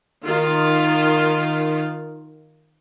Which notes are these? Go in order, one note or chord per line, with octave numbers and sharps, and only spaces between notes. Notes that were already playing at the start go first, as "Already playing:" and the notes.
D#3 F4